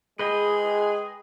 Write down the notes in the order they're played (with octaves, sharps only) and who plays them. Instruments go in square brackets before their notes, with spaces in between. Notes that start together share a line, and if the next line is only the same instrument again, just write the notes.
[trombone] G#3 [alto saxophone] G#4 [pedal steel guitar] B4 D#5 G5